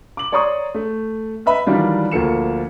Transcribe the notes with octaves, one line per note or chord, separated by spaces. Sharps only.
D6 F#7
C#5 D5 A#5 C6 C#6 D#6
A3
B4 D#5 E5 B5
D#3 E3 F#3 G3 D4 F4
D2 F3 A#3 A4 C#7 E7